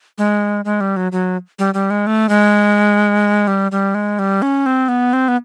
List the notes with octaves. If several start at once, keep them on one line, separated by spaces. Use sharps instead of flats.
G#3
G#3
G3
F#3
F#3
G3
G3
G#3
A3
G#3
G3
G3
G#3
G3
C#4
C4
B3
C4
B3